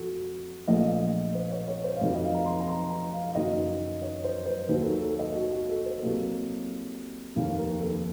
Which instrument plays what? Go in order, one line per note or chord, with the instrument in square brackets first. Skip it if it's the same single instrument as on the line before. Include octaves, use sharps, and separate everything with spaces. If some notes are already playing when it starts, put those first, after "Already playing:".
Already playing: [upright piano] F2 F#4 A4
A#1 A#2 F3 A3 D#5
C5
C#5
C#5
C5
F5
F1 F2 D#3 F#3 D#5
D#5
F5
A#5
C6
A#5
C6
A#5
F5
F5
F#1 F#2 D#3 F#3 D#5
C#5
C5
C5
D#2 D#3 F#3 C5
A4
A#4
A4
D#5
F#4
F#4
A4
C5
C2 C3 F#3 A#3 A4
F1 D#2 D#3 A#3 F5
A#4
A4